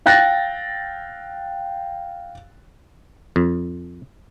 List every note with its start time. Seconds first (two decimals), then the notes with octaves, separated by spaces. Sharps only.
0.06 F5 G5 F#6 A6 A#6
3.36 F2